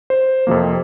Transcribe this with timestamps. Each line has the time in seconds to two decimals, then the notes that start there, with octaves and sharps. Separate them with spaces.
0.10 C5
0.47 F2 C3 F3 A#3